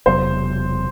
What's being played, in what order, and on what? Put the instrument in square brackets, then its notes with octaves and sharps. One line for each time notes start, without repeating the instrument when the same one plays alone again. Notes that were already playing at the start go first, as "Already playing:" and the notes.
[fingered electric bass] E1 E2 C3 F#3 [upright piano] C5